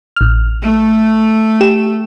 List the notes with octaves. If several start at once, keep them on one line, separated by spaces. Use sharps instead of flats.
A1 F6
A3
G4 E7